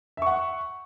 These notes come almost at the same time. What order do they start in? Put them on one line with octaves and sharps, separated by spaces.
E5 C#6 F#5